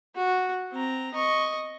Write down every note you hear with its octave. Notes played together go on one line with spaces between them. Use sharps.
F#4
C4 A#5
D#5 C#6